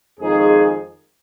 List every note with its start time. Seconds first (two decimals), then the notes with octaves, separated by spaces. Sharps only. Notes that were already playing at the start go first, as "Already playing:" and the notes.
0.20 F2 D#3 G#3 D#4 F4 G#4